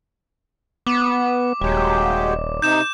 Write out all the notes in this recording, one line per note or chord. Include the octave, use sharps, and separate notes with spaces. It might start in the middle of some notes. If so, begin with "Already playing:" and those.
B3 D6
D#1 F#3 G#3 G4
C3 D#4 G6 E7